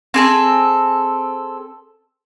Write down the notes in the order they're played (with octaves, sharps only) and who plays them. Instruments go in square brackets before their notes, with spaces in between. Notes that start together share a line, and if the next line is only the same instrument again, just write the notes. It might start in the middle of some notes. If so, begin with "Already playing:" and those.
[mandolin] C4 G#4 A4